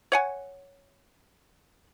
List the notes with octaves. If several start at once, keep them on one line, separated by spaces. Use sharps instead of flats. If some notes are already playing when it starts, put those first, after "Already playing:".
C#5 F#5 G#5